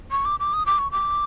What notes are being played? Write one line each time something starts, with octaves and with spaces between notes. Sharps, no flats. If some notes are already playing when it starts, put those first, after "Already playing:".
C#6
D6
D6
D#6
D6
C#6
D6